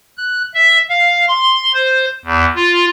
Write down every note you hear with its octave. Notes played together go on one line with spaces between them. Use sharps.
F#6
E5
F5
C6
C5
E2
F4